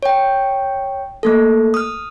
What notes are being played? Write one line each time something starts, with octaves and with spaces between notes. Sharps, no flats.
C#5 G5
A3 A#3 A4
D#6 F6